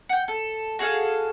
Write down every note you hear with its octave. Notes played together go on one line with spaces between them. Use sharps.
F#5 G5
A4
F#4 G#4 A4 F5